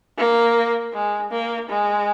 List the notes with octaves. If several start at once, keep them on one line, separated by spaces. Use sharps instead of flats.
A#3
G#3
A#3
G#3